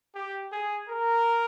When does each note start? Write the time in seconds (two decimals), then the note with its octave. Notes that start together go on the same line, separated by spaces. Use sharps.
0.15 G4
0.52 G#4
0.89 A#4